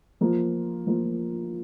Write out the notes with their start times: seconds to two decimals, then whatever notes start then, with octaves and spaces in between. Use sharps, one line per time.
0.21 F3 A#3 F4
0.87 F3 A#3 F4